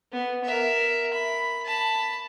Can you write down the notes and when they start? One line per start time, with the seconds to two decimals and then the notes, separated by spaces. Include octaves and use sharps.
0.12 B3
0.44 A#4 E5
1.14 B5
1.65 A5 B5